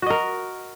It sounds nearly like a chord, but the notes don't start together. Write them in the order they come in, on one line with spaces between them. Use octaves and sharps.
F#4 D#5 A#4